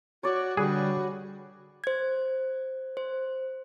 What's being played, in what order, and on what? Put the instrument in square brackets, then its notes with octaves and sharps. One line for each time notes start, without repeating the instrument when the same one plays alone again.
[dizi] F#4 [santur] C#5 D5
[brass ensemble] D3 G3 [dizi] F#4 [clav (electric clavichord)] G#4 [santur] B4
[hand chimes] C5 G#6
C5